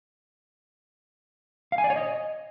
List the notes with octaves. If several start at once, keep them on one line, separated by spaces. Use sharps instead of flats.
F5
G#5
D5
C#5
D#5